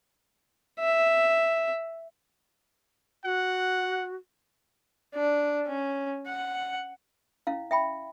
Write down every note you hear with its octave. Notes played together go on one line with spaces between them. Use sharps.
E5
F#4 F#5
D4
C#4
F#5
C#4 E4 F5
E5 G5 B5